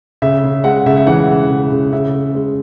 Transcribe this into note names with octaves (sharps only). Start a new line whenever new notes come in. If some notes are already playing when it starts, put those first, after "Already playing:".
C#3 E5
C#3
G#3 F#5
C#3 E5
E5
E3 F#5
C#3
C#3
C#3
C#3 E5
C#3
G#3